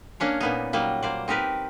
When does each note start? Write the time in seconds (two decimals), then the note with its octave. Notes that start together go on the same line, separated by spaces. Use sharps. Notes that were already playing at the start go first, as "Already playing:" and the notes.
0.20 A#3 C#4 D4 C#5
0.41 A#2 B3 D#4
0.73 F#3 G3 A#3 D#4
1.03 A#3 C5 D5
1.28 C4 D#4 G4 A#4 B4